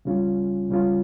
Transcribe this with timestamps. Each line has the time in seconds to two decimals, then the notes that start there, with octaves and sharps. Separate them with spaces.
0.05 C#2 C#3 G3 C#4 F4
0.68 C#2 C#3 G3 C#4 F4